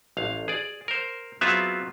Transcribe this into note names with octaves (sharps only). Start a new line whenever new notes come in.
A1 F5
G#4 D5
A#4 C5
F#3 B3 C4 F4 G#4 E5